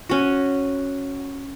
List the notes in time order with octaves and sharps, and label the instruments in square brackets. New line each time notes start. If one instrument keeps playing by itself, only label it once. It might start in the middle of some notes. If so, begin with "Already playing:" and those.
[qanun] C#4 F#4